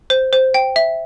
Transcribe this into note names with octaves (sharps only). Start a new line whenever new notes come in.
C5
C5
G5
E5